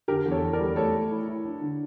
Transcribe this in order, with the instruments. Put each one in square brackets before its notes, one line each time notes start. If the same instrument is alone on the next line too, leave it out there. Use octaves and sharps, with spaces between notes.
[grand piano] D3 [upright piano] G4 A#4
[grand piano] E2
[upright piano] A4 C#5
[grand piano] E2
[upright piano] A#4 D5
[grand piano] G3
[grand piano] A3 [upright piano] A4 C#5
[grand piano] A3
E4
E4
D4
D3